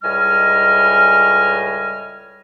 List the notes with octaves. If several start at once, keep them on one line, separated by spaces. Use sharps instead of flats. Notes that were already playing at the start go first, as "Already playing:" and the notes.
C#2 A2 G3 D#5 G#5 F6